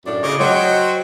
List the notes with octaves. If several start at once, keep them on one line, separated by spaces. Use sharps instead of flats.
F#2 A2 D4
C#3 C#5 D#5 D6
F#3 F#4 C5 C#5 D#5 G5